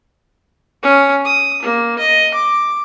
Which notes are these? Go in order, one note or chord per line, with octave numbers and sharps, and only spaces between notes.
C#4
D#6
A#3
D#5
D6